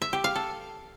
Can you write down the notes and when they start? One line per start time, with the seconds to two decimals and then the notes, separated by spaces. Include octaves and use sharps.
0.02 E5
0.13 G4
0.24 F5
0.35 A4